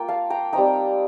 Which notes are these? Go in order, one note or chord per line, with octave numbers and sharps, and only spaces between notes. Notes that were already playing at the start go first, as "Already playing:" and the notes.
Already playing: A#3 F4 G5
F5 A5
G5 A#5
G3 C4 D#4 G5 A#5